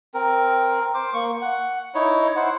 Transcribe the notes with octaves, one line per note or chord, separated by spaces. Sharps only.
C4 A#4
C5 D6
A#3 C#6
F#5
D#4 E4 C#5
E4 C5 F#5